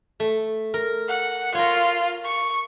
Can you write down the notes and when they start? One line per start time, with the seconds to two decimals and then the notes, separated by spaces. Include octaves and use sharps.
0.20 A3
0.74 A#4
1.08 F#5
1.55 F4 A#4 C#5
2.24 C#6